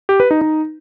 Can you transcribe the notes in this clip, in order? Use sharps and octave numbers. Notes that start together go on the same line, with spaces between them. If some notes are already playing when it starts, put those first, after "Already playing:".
G4
B4
D#4
D#4